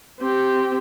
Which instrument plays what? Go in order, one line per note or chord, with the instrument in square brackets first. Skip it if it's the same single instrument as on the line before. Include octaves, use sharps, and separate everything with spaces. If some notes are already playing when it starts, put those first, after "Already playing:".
[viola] C4 G4